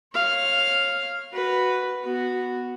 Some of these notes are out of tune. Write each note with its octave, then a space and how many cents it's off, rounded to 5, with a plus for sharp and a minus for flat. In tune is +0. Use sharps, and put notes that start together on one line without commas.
C#5 -20 F5 +0
F#4 +0 B4 +0
B3 +0 F#4 +0